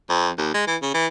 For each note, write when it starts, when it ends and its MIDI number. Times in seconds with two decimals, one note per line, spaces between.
0.10 0.29 41
0.38 0.51 39
0.54 0.66 56
0.67 0.77 52
0.82 0.93 49
0.94 1.07 52